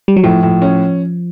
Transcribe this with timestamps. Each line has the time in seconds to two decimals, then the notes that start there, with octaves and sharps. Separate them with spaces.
0.08 G3
0.17 F#3
0.23 A2 F3
0.43 A2
0.62 C#4